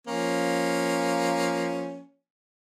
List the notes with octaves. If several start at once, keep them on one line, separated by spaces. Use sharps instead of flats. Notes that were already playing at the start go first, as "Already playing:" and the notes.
F3 A#3 C#4